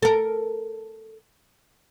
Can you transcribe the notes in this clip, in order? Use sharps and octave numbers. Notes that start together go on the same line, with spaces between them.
A4 A#4